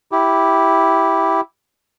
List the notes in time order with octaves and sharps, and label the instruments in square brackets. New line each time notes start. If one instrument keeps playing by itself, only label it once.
[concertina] E4 G4